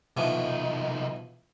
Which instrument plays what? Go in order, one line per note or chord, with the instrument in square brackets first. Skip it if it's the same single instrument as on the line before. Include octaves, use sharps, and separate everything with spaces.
[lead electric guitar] C2 D#4 [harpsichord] B2 E3 F3